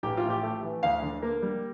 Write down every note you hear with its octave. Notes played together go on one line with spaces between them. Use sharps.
A1 G4
F4
A2
G4
A3
E3
D2 F5
D3
A#3
G3